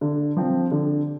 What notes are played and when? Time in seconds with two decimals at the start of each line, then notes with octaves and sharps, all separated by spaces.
0.01 D3
0.37 F3 C4
0.71 D3